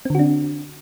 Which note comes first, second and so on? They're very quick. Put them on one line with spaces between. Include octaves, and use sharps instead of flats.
C4 D3 F#4 D4